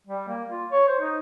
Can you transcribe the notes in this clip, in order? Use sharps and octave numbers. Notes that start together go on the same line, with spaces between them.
G3
A#3
F4
C#5
C5
D#4